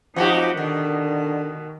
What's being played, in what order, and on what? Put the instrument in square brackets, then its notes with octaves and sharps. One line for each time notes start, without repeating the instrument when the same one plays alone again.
[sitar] F2 F#4 G4 [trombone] F3 [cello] D#4
[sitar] B2 [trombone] D3 [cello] D#3